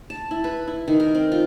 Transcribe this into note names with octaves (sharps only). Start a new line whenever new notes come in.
A5
E4
B4
E4
D#3
A#4
C4
F4